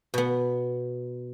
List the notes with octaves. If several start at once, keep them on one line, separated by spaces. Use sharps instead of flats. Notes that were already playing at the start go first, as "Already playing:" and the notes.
B2 B3